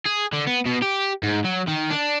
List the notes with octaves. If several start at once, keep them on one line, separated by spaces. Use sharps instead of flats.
G#4
D3
B3
B2
G4
G#2
F#3
D#3
D4